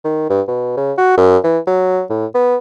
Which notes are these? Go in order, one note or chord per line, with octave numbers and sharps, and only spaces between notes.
D#3
G2
B2
C#3
F#4
F#2
E3
F#3
A2
B3